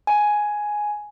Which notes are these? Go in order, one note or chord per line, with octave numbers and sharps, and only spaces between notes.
G#5